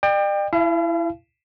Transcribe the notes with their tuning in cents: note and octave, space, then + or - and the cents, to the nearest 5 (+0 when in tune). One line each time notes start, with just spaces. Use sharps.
D5 +45 G5 +20
E4 +15 F5 -40 A5 -45